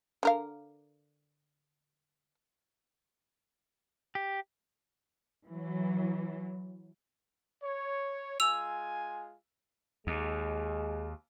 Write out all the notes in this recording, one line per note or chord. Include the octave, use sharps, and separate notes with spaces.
D3 A#4 F5
G4
E3 F#3
C#5
G#3 F4 G#5 E6 F7
D#2 G#3